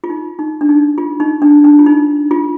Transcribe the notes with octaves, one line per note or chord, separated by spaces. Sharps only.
F4
D#4
D#4
D4
D#4
F4
D#4
D4
D4
F4
D#4
F4